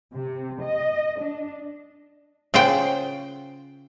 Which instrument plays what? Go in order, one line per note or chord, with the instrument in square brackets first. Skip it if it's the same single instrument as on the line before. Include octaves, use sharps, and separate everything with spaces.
[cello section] C3
D#5
D4
[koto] C#3 F4 C5 F#5 G5